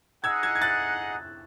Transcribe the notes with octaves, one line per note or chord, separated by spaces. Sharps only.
D#4 G#4 D#5 F#5 E6 G#6
E6 G#6
G#6
F#6 A6